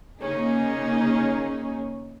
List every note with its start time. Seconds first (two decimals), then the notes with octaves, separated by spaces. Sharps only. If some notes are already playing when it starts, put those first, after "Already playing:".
0.20 C#3 A#3 C#4 D#4 G#4